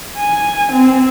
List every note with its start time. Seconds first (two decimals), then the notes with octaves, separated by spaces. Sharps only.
0.19 G#5
0.72 C4